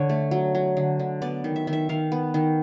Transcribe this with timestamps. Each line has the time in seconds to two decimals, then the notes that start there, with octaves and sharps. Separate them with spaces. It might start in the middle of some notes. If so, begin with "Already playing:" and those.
Already playing: D3 C#5
0.09 A3
0.31 F#3
0.55 F#3
0.77 D3
0.99 D3
1.22 B3 D5
1.44 D#3
1.56 E5
1.67 D#3
1.73 E5
1.89 D#3 F5
2.12 B3
2.34 D#3